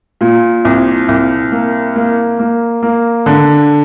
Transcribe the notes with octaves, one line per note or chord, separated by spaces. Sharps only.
A#2
C2
C2
A#3
A#3
A#3
A#3
D3